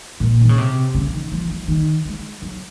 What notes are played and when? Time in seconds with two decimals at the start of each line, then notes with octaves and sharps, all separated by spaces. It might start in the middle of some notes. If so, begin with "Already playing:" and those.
0.20 A#2
0.41 D#3
0.49 C#3
0.58 C3
0.95 C#3
1.14 D#3
1.32 F3
1.50 F3
1.68 D#3
2.05 G#3
2.42 F#3